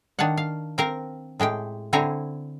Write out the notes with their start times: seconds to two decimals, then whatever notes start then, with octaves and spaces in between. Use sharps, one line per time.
0.19 D#3 D4 C#5 F5 F#5
0.37 F5
0.78 C4 A#4 F5 A#5
1.40 A2 G#3 G4 G5
1.93 D3 C4 E4 C#5 G#5 A#5